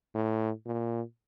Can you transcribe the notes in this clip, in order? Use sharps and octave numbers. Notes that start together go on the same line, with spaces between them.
A2
A#2